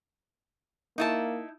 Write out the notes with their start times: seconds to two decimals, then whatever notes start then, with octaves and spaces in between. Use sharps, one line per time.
0.98 A#3 D#4 E4 A5